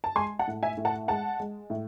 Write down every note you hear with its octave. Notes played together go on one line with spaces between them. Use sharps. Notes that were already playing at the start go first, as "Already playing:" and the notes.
A5
G#3 G#5 C6
F#5 A5
A2
E5 G#5
A2
F#5 A5
G#3 F#5 A5
G#3
A2